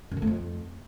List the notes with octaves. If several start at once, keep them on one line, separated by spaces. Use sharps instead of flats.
F#2
D3
A3
F2